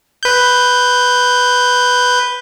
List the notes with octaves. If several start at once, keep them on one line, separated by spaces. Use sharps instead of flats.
B4 G6